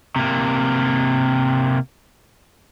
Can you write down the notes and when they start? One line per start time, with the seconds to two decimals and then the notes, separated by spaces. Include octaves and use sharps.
0.16 C3 A#3